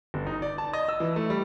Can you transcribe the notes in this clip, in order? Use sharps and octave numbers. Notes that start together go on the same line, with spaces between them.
G1
D#4
D5
A5
D#5
E6
E3
A3
G3